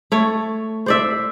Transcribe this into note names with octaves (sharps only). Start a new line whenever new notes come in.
A3 C#5
C5 D5 E5